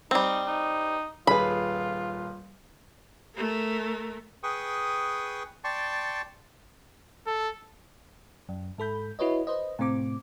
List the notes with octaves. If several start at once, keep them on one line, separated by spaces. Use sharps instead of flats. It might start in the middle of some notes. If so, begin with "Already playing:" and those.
G3 C4 D#4
D#4
D#1 F4 G#4 B4 B5
A3 A#4
G#4 B4 G5 C#6 D#6
D5 G5 A5 C6 C#6
A4
F#2
G#2 A4 B5 G6
E4 F#4 B4 C#5 D#5
B4 C5 D#5
A2 C3 C4 D6